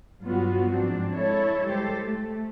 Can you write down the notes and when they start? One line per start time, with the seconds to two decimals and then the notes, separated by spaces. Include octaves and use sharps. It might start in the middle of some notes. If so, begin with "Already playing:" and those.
0.23 G2 F#3 G3 B3 F4 F#4
0.73 G#2 F3 C4 D4
1.15 G#3 E4 A4 C#5
1.67 G3 G#3 G4 A4 C5
2.04 A3